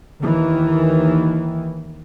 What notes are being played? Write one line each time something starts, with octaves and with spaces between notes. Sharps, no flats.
D#2 D#3 E3